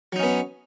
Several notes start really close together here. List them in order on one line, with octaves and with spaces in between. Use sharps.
F#3 D#4 C#4 B3